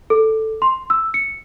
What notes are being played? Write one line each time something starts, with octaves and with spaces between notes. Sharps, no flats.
A4
C6
E6
C#7